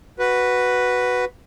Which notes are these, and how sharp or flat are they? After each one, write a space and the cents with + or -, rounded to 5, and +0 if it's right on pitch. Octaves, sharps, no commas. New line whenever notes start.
F#4 +0 B4 +0